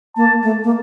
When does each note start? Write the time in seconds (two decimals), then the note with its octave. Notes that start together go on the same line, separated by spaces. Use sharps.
0.16 A#3 A5
0.43 A3
0.64 A#3